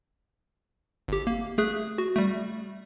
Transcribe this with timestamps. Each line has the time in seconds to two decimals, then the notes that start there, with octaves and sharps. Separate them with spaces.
1.08 G1 G4
1.27 A#3
1.58 A3 G#4 F#6
1.98 F#4
2.16 G3 A3